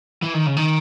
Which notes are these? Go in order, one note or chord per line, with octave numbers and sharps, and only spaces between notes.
E3
D#3
C#3
D#3